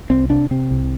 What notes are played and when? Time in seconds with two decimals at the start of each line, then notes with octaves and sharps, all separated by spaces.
0.10 C2 C4
0.30 C3 D4
0.51 C3 C4
0.71 C2